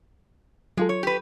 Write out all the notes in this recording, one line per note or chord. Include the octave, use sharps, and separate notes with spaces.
F#3 G#3 F4 A4
C#5
G4 B4